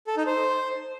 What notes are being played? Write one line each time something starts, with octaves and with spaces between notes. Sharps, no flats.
A4
D#4
C5